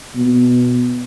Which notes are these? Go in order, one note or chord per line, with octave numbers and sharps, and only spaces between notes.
B2